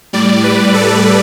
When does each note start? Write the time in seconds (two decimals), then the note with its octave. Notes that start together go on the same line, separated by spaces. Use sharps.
0.13 A2 G3 D5
0.44 B4
0.74 A4